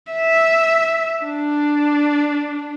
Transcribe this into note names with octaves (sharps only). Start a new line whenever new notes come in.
E5
D4